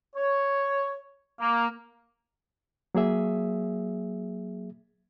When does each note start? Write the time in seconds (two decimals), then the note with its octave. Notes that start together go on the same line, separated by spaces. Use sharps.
0.16 C#5
1.41 A#3
2.95 F#3 A#3 G#4 E5